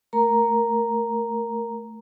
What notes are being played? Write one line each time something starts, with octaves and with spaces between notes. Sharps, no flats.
A3 A#4 A#5